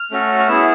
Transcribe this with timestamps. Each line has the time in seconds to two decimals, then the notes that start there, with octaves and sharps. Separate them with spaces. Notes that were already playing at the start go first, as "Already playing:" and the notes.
Already playing: F6
0.11 A3 C#4 F#4 A4
0.39 F6
0.48 B3 E4 G#4 E6